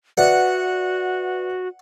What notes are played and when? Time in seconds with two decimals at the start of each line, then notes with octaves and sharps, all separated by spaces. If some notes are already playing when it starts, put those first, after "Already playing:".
0.18 F#4 B4 D5 E5 F#5